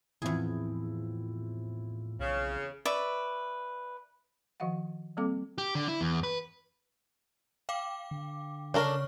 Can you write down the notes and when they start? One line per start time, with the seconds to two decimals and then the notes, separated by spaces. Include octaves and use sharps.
0.22 E2 A2 F3 C4 E4 G#4
2.20 B1 C#3
2.85 B4 D5 E5 C#6
4.60 D#3 F3 F#4 D#5 F5 F#5
5.17 G3 A#3 C4 A4 F5 D6
5.58 G4
5.75 D3
5.88 E4
6.01 E2
6.23 B4
7.69 F5 G5 D6
8.11 D3
8.74 C#3 D4 A4 A#4 C#5 C#6 F6